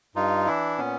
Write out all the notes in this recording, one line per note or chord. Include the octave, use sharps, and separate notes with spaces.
G2 D#4 F4
E3 D4 E4
A#2 B3 C#4